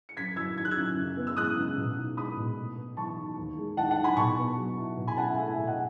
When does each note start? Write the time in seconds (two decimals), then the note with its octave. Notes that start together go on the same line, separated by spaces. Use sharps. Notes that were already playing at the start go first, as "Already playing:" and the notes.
0.09 C#7
0.17 F#2 G#6 B6
0.36 F#3 E6 G#6
0.57 D#3 G#6
0.65 F#6
0.71 E6 G#6
0.77 F#2
0.97 C#3
1.17 B3
1.27 E6
1.37 G#3 D#6 F#6
1.58 C#3
1.78 B2
1.98 D#4
2.17 G#3 B5 D#6
2.37 B2
2.57 A2
2.77 B3
2.97 E3 A5 C#6
3.17 D#4
3.38 D#2
3.58 G#3
3.77 D#3 F#5 A5
3.90 F#5 A5
3.96 D#4
4.04 G#5 B5
4.16 B2 A5 C#6
4.38 B3
4.57 F#3
4.77 E4
4.97 B2
5.07 G#5 B5
5.17 C#4 F#5 A5
5.27 E5 G#5
5.37 A3 E5 G#5
5.47 E5 G#5
5.57 B2
5.67 D#5 F#5